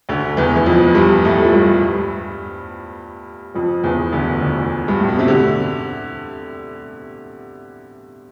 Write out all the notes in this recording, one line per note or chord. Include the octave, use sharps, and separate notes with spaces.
D2 D3
E2 E3
E3
F2 F3
G2 G3
A2 A3
F3
G2 G3
F2 F3
E2 E3
D2 D3
D2 D3
G2
A2
B2
C3
D3